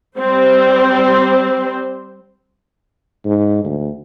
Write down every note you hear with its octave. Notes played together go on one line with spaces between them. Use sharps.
G3 C4 C5
G#2
D2